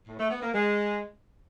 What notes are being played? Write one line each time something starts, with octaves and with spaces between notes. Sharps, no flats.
A2
A3
B3
A#3
G#3